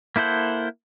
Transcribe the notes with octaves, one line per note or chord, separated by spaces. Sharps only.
A#3 E4 A4 C5 F#5